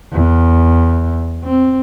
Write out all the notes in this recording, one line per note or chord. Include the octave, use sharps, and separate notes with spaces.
E2
C4